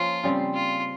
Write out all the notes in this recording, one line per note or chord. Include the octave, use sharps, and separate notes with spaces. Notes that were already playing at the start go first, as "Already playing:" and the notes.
Already playing: F3 A#3 C#4 F4
C#3 G3 C4
F4